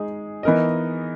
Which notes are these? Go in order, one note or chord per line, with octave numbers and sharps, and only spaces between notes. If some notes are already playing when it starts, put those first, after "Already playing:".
Already playing: G#3 D#4 G#4
E3 B3 D#4 A#4 D#5